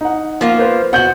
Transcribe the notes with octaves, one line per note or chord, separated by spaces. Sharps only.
D#4 F#5
F3 A#3 F4
B4 C5
B2 F#4 F#5 G6 F#7